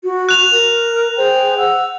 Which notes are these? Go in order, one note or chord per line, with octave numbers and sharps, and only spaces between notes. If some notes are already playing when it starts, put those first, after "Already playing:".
F#4
F#6 F7
A#4
G#4 C5 G5
F#5 E6